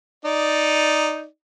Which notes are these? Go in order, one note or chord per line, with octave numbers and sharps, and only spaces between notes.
D#4 D5